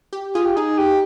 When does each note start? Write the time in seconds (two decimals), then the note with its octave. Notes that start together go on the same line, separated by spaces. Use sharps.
0.13 G4
0.35 F4 G#4
0.46 G4
0.56 D#4 G#4
0.78 G4